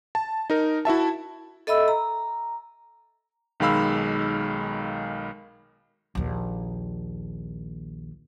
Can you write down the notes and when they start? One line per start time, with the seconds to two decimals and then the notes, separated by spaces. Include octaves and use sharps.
0.15 A5
0.50 D#4 A#4
0.85 E4 F#4 E5 A5
1.67 A4 D#5 E5 B5 E6
1.88 A#5
3.60 B1 D#3 G#3 F5 B5 E6
6.15 A#1 D#2